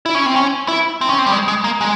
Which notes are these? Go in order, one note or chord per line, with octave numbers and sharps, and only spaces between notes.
E4
C#4
C4
C#4
E4
C4
C#4
C4
G3
G#3
G#3
A#3
G#3